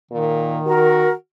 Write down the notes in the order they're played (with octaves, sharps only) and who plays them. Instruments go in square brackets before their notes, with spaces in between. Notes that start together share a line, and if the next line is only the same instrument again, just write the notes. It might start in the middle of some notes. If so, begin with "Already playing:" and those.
[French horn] A#2 [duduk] D#3
[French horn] F#4 [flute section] A#4